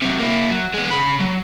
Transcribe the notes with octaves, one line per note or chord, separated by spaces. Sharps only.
C3 F#3
A#3 E4
F#3
G#3 B3
C#3 B5
F#3